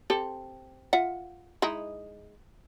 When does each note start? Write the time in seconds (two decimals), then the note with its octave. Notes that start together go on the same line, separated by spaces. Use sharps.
0.10 C4 G4 A4
0.93 F4 E5 F#5
1.62 G#3 D#4 E4